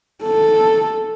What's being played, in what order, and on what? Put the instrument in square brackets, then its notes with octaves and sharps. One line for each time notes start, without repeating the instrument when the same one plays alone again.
[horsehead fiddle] A4